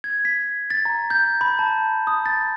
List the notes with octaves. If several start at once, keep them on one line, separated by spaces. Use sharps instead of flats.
G#6
B6
A6
A#5
G6
B5
A5
D#6
A6